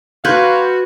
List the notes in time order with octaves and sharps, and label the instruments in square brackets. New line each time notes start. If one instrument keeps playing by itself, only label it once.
[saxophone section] F#3 C#4 F5 [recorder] F#4 [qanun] B4 [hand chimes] C6 G6 G#6